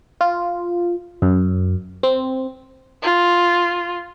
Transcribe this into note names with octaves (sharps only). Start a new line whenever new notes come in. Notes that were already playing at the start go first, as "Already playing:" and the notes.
F4
F#2
C4
F4